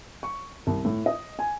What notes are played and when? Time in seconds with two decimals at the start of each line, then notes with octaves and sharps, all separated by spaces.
0.23 C#6
0.67 C2
0.85 A2
1.06 D#5
1.39 G#5